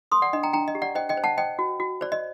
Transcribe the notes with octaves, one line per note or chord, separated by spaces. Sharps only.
A#4 C6 D#6
D5 F#5
D4 D#5
G5 A#5
D4 G5 A#5
D#5
G4
D5 F#5
C5 D#5 G5
D#5 G5
C5
F#5 A5
C5 D#5 G5
F#4
F#4
C5 D5
D#5